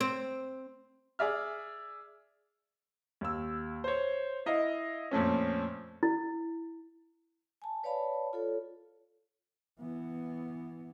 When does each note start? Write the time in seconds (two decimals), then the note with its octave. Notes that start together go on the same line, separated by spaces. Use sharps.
0.01 C4
1.19 G#4 D5 E5 F6
3.21 D#2 E6
3.84 C5 C#5
4.46 E4 D#5 F5
5.11 F2 A#2 A3 C#4
6.03 E4
7.62 G#5 A5
7.83 B4 C#5 D5 F5 A5 B5
8.33 F4 A4 C#5
9.80 E3 B3